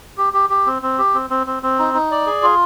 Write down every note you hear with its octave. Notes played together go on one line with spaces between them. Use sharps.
G4
G4
G4
C4
C4
G4
C4
C4
C4
C4
D#4
D#4
D5
G#4
F4